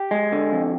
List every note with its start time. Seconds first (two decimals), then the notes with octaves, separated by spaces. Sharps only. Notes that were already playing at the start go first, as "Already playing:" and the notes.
Already playing: G4
0.11 G#3
0.32 D3
0.52 F2